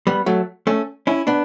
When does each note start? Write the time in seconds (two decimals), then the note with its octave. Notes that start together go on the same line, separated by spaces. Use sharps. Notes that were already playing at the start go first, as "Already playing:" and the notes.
0.07 G3 B3
0.26 F#3 A3
0.67 A3 C#4
1.07 C#4 E4
1.27 B3 D4